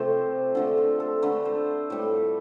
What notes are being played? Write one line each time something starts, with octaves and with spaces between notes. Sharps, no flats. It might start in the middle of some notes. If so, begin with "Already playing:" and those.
Already playing: C3 F3 A3 C5 D5
D3 F3 A3 A4
F4
A4
D3 A3 B4
C5
A2 G3 B4